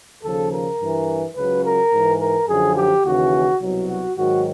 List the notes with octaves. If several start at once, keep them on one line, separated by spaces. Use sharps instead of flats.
D#2 C#3 F3 A4
A#4
G2 E3
C#2 C#3 F#3 B4
A#4
G#2 E3
A#4
F#2 D3 F3 G#4
G4
D#2 C#3 E3 F#4
C2 B2 F#3
F#4
G#2 D#3 F#3 F#4